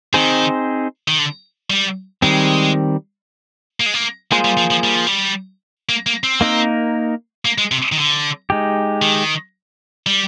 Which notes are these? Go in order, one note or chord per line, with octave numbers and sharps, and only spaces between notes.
D#3 C4 D#4 G#4 C5
D#3
D3
G3
D#3 G3 G#3 C4
A#3
G#3
A#3
G#3 A#3 F4 G#4 C5
G3
F3
F3
G3
F3
G3
A#3
A#3
C4
A#3 D#4 A#4
A#3
G#3
C3
D#3
D3
G#3 D#4 G4
D#3
G3